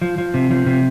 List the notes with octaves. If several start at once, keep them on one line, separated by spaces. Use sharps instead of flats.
F3
F3
C3
F3
C3